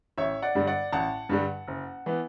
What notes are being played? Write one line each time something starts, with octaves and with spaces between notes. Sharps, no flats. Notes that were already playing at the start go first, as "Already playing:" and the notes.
A1 C#5 E5
D5 F#5
G2 D3 G3
D5 F#5
A1 F#5 A5
G2 D3 G3
F#1
E3 B3